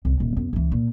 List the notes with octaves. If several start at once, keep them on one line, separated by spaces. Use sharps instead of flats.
C2 C#3
D#1
F#2 B3
C#2 E3
A#2